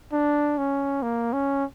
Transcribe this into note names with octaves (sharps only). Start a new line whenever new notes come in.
D4
C#4
A#3
C#4